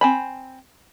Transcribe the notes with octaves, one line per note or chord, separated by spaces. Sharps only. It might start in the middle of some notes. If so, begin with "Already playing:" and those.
C4 G#5 B5